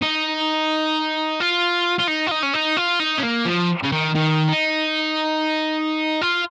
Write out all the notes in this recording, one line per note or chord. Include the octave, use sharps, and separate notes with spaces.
D#4
F4
F4
D#4
F4
D#4
C#4
D#4
F4
D#4
C#4
A#3
F3
C#3
D#3
D#3
D#4
F4